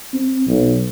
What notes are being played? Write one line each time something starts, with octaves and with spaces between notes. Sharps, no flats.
C4
B1